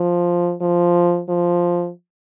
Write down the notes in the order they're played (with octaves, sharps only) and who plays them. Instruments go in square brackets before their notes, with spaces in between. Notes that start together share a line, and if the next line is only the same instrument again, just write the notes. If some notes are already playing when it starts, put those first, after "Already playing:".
Already playing: [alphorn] F3
F3
F3